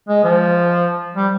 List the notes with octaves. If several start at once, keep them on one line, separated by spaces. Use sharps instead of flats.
G#3
F3
G3